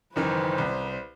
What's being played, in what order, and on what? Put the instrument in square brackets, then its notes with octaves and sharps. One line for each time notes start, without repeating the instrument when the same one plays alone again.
[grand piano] F#1 D#3 E3 [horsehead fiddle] B4 C5
[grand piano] C2